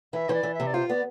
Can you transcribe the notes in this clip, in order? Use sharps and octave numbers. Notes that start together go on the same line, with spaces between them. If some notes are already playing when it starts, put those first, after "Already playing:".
E3 E5
E3 C5 D5
E3
E5
C3
D5
F4 C5
B3 D5